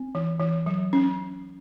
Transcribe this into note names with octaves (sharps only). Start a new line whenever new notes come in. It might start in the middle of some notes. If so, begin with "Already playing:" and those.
Already playing: C4
E3
E3
F#3
C#4